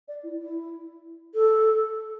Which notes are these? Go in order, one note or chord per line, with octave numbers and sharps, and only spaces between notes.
D5
E4
E4
A4